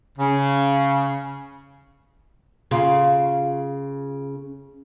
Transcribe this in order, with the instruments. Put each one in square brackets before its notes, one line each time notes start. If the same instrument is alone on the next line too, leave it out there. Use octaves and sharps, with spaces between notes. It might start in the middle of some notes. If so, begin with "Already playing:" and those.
[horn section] C#3
[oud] C#3 F4